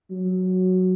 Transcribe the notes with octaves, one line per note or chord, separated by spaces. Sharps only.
F#3